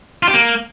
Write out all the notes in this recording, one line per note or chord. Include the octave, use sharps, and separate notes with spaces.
F4
G4
A#3